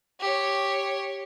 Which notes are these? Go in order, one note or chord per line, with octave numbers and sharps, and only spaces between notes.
G4 C#5